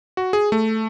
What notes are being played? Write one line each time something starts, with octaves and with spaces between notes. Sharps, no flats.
F#4
G#4
A3